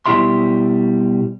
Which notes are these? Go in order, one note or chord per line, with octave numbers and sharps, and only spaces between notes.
B2 G3 E4 G4 E5 C6